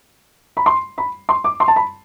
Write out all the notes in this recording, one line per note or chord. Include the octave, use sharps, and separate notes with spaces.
B5
C6
B5
C6
D6
C6
A5
B5